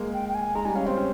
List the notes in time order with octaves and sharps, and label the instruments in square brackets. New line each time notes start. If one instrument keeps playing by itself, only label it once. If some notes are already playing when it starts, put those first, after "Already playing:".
Already playing: [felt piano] G#3 A#3
[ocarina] G5
G5
G#5
[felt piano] G#3 [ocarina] A#5
[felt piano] G3 [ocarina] G#5
[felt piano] C#4 [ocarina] F5
[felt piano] C4 [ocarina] C5
[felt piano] C#4